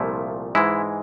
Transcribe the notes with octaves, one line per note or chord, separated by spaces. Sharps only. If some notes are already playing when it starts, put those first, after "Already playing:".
Already playing: C2 A#2 F3 A3 E4
G#2 E3 G#3 E4